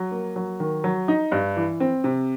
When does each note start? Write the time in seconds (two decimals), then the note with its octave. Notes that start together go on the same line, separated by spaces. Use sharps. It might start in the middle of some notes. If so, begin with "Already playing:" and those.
Already playing: F#3
0.11 A#3
0.36 F#3
0.60 D#3
0.84 F#3
1.08 D#4
1.32 G2
1.56 E3
1.80 C4
2.04 C3